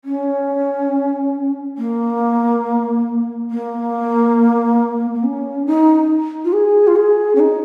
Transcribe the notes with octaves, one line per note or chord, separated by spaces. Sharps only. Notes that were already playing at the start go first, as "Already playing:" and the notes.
C#4
A#3
A#3
A#3
C#4
D#4
F4
G#4
F4
G#4
C#4
D#4